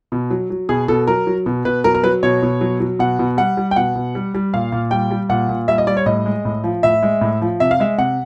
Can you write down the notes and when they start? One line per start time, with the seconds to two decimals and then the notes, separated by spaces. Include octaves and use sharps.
0.12 B2
0.30 F#3
0.50 F#3
0.69 B2 G#4
0.88 B2 A4
1.07 F#3 A#4
1.27 F#3
1.46 B2
1.65 B2 B4
1.84 F#3 A#4
1.94 A#4
2.04 F#3 B4
2.23 B2 C#5
2.42 B2
2.61 F#3
2.80 F#3
2.99 B2 F#5
3.19 B2
3.37 G3 F#5
3.57 G3
3.71 G5
3.76 B2 F#5
3.95 B2
4.15 G3
4.34 G3
4.53 A#2 F5
4.72 A#2
4.91 G3 G5
5.11 G3
5.29 A#2 F#5
5.49 A#2
5.68 G3 E5
5.78 D#5
5.87 G3 D5
5.97 C#5
6.06 A2 D#5
6.26 G#3
6.45 A2
6.64 F3
6.83 A2 E5
7.03 G#3
7.21 A2
7.42 F3
7.60 C3 E5
7.71 F5
7.80 G#3 E5
7.98 C3 F#5